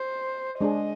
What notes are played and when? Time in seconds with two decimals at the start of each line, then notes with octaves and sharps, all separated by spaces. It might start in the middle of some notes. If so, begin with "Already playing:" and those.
Already playing: C5
0.61 G#3 D4 G#4 D#5